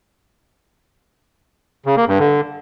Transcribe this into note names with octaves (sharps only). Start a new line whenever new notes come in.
C#3
A#3
G2
D3